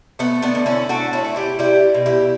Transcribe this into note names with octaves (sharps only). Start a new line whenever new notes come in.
A3 B3
B3 D4
D3
C#4 E4
A3 D4 F#4
C#4 E4
A3
E4 G4
G3 E4 G4
B2
E4 G4